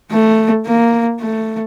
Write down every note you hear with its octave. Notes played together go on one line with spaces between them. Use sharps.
A3
A#3
A3